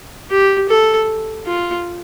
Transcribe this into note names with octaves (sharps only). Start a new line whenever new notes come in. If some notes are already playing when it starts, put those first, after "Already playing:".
G4
A4
F4